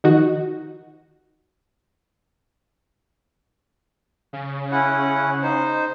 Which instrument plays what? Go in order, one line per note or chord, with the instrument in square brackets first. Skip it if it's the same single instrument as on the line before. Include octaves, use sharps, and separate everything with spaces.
[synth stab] D#3 F3 D#4 F#4
[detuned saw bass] C#3
[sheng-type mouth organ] C#4 E4 F#5
D#4 C5